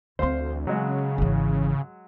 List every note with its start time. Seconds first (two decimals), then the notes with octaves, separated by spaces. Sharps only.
0.19 D2 E3 C4 C5 F5 C6
0.67 C#3 F#3 G#3 F#4
1.18 G#1 E3